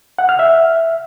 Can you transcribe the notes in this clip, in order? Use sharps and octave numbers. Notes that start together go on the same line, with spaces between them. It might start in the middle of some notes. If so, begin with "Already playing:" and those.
F#5
F6
E5